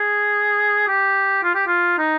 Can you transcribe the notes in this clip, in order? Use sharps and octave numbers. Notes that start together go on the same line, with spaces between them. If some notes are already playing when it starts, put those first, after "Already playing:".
Already playing: G#4
G4
F4
G4
F4
D#4